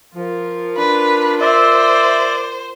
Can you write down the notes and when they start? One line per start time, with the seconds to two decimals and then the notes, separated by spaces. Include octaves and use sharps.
0.15 F3 F4 A#4
0.77 D4 B4
1.40 C5 D5 E5